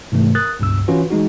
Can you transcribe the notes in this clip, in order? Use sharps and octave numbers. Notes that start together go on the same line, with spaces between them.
G#2 C3 E3 A3
A#4 D#6 F#6 A6
C#2 G2 B2 E6
E3 C#4 F4 F#4 B4
E3 G#3 D#4 F#4